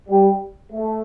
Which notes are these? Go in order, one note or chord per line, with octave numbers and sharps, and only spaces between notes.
G3
A3